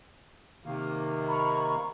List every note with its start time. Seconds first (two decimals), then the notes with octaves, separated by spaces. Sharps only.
0.65 C3 D#3 A#3
1.27 A#5 B5 C#6